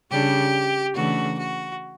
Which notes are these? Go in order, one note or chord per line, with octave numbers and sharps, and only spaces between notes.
C#3 G3 D4 G4
C#3 E3 A3 D4 F#4
F#4